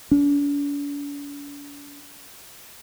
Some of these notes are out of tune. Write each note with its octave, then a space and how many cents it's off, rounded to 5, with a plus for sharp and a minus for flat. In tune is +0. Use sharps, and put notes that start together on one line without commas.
D4 -45